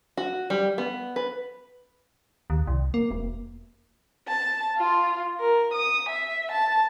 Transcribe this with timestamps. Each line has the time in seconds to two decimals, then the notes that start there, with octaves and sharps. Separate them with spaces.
0.17 F#4
0.50 G3
0.78 B3
1.16 B4
2.50 D#2
2.67 C2
2.94 A#3
3.11 E1
4.28 A5
4.78 F4
5.40 A#4
5.73 D#6
6.09 E5
6.51 A5